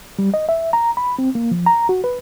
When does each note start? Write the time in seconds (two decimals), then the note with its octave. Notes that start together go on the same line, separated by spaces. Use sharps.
0.19 G3
0.34 D#5
0.49 E5
0.73 A#5
0.97 B5
1.19 C4
1.35 A#3
1.51 F3
1.66 A#5
1.89 F#4
2.04 B4